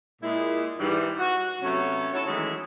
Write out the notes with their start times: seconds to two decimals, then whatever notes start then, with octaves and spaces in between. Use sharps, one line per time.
0.22 A#2 G#3 E4
0.79 G#2 E3 G3
1.18 F#4
1.62 C3 F#3 A3 B3 C#4
2.13 D#4 E4 F#4 A4 C#5
2.26 D#3 E3 F#3 G#3 A3 C#4